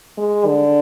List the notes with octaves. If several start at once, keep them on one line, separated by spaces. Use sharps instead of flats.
G#3
D3